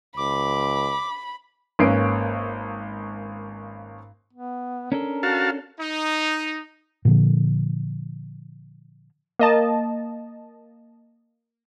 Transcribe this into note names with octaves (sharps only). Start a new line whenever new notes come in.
C#2 B5 D6
G#1 A#3 C#4 B4 C7 D7
B3
C#4 D4 A4 A#4
F#4 F5 A5
D#4
A#2 D3 F3
A#3 D#5 A5